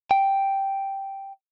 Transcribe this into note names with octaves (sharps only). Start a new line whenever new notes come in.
G5